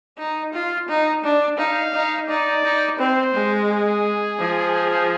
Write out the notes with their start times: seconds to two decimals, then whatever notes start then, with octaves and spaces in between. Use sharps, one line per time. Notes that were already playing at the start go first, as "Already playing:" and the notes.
0.18 D#4
0.53 F4
0.89 D#4
1.24 D4
1.58 D#4 F5
1.94 D#4
2.28 D#4 D5
2.64 D#4
2.99 C4 C5
3.34 G#3
3.69 G#4
4.39 F3